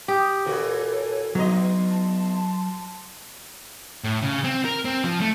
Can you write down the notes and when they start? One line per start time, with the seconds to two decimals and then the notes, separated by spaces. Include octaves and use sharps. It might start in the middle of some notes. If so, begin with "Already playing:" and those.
0.08 G4 D#6
0.45 A#2 E3 F#4 A4 C#5
1.35 E2 F#3 D#4 D#5 C6
1.89 A5 C6
4.04 A2
4.22 C#3
4.44 C4
4.65 A#4
4.85 C4
5.05 F3
5.21 A3